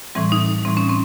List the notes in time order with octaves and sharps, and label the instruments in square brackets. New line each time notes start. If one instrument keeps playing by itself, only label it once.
[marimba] A2 E3 G3 C4
D#4
A2 E3 G3 C4
C#4
C4